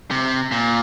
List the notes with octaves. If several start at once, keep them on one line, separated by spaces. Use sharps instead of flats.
C3
A#2